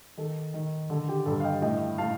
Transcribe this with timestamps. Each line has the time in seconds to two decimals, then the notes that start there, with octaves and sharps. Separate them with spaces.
0.17 D#3 A4
0.54 D#3
0.90 D3 A4
1.09 G4
1.26 G2 A4
1.40 F5
1.44 D#5 G5
1.62 A2 D#5 G5
1.98 A2 F5 A5